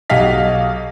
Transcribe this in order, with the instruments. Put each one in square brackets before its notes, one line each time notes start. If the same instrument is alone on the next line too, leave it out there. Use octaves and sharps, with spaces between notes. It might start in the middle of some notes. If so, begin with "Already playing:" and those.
[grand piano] B1 F#4 G4 D#5 F5 B6